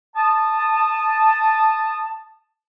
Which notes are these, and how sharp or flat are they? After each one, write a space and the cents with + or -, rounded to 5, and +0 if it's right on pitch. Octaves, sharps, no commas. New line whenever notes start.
A5 +0 D#6 -15